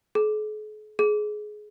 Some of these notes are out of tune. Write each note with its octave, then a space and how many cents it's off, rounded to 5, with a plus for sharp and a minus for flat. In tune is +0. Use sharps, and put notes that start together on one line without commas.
G#4 +45
G#4 +20